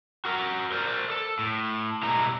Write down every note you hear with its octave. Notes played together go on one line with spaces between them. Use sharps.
F#4 A#4
A#4 C5 D5
A4
A2
B2 G3 G#3 E4 A#5